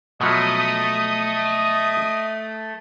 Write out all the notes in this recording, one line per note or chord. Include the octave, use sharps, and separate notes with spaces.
B2 F3 F#3 A3 D#5 D#6